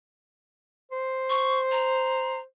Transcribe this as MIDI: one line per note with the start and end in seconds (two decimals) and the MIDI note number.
0.92 2.42 72
1.30 1.59 85
1.72 2.39 82